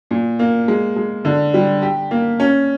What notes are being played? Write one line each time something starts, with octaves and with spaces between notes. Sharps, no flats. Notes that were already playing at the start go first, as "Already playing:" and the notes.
A#2
A#3
G#3
G#3
D3
G3
G4
A#3
C#4